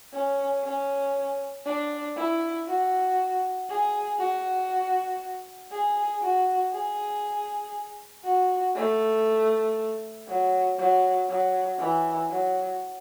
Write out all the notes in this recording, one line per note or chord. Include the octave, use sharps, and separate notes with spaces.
C#4
C#4
D4
E4
F#4
G#4
F#4
G#4
F#4
G#4
F#4
A3
F#3
F#3
F#3
E3
F#3